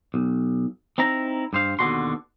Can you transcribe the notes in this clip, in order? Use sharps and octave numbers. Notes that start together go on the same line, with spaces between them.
B1
C4 D#4 E4 A#5
G2 C5 F5
D#2 B2 D3 G#3 F#4 C6